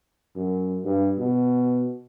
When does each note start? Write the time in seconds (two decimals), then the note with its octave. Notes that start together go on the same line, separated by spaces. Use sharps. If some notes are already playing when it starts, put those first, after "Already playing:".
0.36 F#2
0.85 G2
1.19 B2